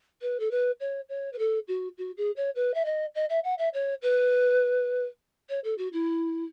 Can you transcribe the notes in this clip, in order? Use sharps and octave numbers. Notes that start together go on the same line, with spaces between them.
B4
A4
B4
C#5
C#5
B4
A4
F#4
F#4
G#4
C#5
B4
E5
D#5
D#5
E5
F#5
E5
C#5
B4
C#5
A4
F#4
E4